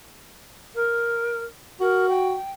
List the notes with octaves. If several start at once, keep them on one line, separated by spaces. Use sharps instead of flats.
A#4
F#4 A#4
G5